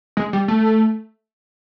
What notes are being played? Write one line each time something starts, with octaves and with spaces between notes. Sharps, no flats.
G#3
G3
A3